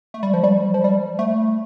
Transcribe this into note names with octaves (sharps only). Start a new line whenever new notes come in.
A3
G3
F3
G3
F3
G3
A3